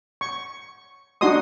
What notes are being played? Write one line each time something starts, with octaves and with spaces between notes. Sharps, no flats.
C#6
D4 D#4 F#4 D#5 C6 D#6